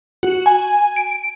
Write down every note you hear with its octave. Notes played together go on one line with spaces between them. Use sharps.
F#4
G#5
D7